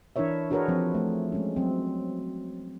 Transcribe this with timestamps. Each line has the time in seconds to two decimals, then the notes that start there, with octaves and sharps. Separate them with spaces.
0.16 E3 D4 E4 A#4 C#5 E5
0.50 D4 F#4 G#4 A#4 B4 C#5
0.68 F3 C4
0.94 A3
1.32 G#3 C#4
1.56 F#3 C4